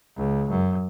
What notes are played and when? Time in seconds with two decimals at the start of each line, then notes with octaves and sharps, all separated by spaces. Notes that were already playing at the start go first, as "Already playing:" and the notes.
0.17 C#2
0.50 F#2